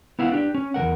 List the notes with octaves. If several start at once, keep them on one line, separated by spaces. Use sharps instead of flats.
B3 E4 F5 F#5
D4 G4
C#4
E2 G3 A#4 F#5